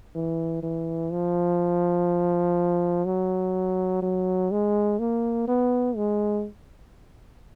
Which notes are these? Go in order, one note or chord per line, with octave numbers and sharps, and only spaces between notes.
E3
E3
F3
F#3
F#3
G#3
A#3
B3
G#3